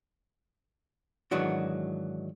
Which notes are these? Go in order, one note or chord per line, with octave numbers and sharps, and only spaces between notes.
G#2 D#3 E3 F#3 D4 F#4